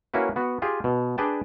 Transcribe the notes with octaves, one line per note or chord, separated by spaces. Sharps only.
A#3 C#4 E4 F#4 B4
B3 F#4
F4 G4 G#4
B2
D4 G#4 B4 D5 G5 A5